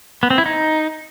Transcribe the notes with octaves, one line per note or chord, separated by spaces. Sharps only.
B3
C4
E4
D#4